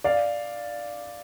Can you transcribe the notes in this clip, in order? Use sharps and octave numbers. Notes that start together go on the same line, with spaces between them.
D5 F5